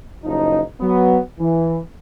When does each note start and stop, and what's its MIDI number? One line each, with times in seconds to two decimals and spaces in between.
0.24 0.60 30
0.24 0.60 53
0.24 0.60 63
0.81 1.19 54
0.81 1.19 59
1.39 1.77 52